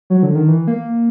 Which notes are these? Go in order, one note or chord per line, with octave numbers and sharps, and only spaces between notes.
F#3
D3
D#3
E3
A#3